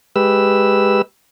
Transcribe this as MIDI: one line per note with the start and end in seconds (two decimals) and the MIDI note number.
0.16 1.02 56
0.16 1.02 67
0.16 1.02 71
0.16 1.02 88